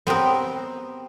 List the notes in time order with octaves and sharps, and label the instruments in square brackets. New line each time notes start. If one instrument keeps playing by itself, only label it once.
[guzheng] B3 C4 G4 A#4